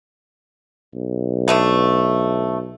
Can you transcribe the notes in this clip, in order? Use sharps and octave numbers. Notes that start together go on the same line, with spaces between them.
B1
D3 A3 B3